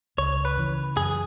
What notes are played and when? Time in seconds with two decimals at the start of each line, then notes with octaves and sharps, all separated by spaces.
0.18 C#2 C#5
0.45 B4
0.57 C#3 E3
0.96 F#2 G#4